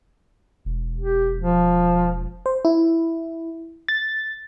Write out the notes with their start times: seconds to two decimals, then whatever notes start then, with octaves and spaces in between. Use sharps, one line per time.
0.65 E1
0.98 G4
1.38 F3
2.46 C5
2.65 E4
3.88 A6